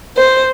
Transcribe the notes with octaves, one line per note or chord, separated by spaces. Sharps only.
C5